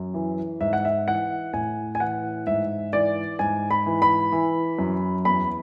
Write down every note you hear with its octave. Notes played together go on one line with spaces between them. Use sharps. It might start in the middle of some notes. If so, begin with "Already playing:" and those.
Already playing: F#2
E3
G#2 E5
F#5
E5
E3 F#5
A2 G#5
G#5
E3 F#5
G#2 E5
E3 D5
G#2 G#5
B5
E3
B5
E3
F#2
E2 B5